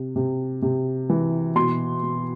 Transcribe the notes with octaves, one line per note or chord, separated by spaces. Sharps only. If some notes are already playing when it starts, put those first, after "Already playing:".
Already playing: C3
C3
C3
E3
B2 C6
B2